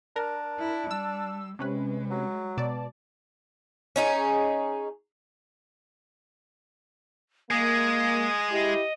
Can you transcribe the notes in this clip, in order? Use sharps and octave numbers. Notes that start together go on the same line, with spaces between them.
D4 A#4
E4
G3 E6
C3 G#3 C#4 B4
F#3
B2 D5 A5
C#4 D#4 G#4
G#3 A#3 D#6
E4 G4 D#5